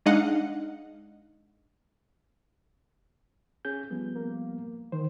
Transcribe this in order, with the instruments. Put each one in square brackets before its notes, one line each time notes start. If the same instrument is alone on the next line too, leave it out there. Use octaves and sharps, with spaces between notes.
[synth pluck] G#3 D4 D#4 D#5 F5 F#5
[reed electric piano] C#4 G#4 G6
F3 G3 B3
[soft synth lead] A#3
[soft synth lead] D#3 [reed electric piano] C5